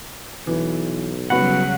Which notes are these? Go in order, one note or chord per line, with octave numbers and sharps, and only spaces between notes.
B1 E3
C#3 F#3 G3 B3 F#4 F#5 B5